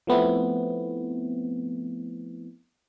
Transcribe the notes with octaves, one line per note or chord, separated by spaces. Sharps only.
F3 A3 B3 C4 E4